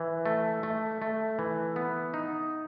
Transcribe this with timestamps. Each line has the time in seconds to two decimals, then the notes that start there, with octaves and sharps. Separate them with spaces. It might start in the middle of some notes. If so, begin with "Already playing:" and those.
Already playing: E3
0.26 A3
0.63 A3
1.02 A3
1.39 E3
1.76 B3
2.14 D#4